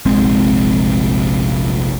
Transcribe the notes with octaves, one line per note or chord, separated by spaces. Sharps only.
F1 A#1 G#3 C4